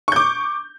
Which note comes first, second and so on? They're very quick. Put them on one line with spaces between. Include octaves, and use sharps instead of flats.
C#6 G6 D6